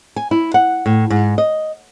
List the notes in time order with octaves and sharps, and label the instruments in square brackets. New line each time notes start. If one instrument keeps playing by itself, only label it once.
[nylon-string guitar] G#5
E4
F#5
A2
G#2
D#5